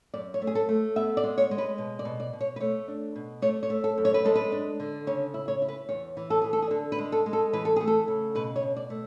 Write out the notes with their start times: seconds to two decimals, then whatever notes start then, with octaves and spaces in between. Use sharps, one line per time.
0.14 F#2 D5
0.34 C#5
0.42 A3
0.47 G#4
0.55 A4
0.69 A3
0.96 B3 E5
1.17 D5
1.24 G#3
1.38 C#5
1.51 G#3
1.58 B4
1.78 B2
1.99 D5
2.05 B2
2.20 D5
2.33 B2
2.41 C#5
2.56 B4
2.60 A3 C#5
2.88 D4
3.16 B2
3.42 A3 C#5
3.63 C#5
3.70 A3
3.84 A4
3.98 F#2
4.05 C#5
4.14 B4
4.25 G#3 A4
4.35 B4
4.52 D4
4.80 D3
5.07 C#3 C#5
5.34 E4
5.48 C#5
5.62 E4
5.68 B4
5.89 E2 C#5
6.17 E3
6.30 A4
6.42 E3 G#4
6.53 A4
6.62 G#4
6.71 D3 A4
6.92 B4
6.98 G#3
7.12 A4
7.26 G#3
7.33 A4
7.53 E3 B4
7.65 A4
7.76 A3 G#4
7.87 A4
8.08 C#3
8.35 B2 B4
8.56 C#5
8.62 B2
8.76 D5
8.90 A3